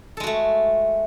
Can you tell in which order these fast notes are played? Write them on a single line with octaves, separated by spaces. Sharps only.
A4 G#3 F#4 A3